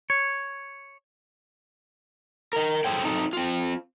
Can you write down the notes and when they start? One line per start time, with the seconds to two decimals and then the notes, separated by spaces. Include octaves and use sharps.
0.10 C#5
2.53 A#4 D#5
2.85 G#4 A4 C5 C#5 G5
3.03 C4 D#4 A4
3.33 C4 F4